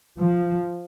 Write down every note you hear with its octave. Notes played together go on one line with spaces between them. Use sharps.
F3